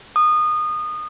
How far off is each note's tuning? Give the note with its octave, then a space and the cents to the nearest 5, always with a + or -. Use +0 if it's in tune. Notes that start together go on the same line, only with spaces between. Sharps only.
D#6 -25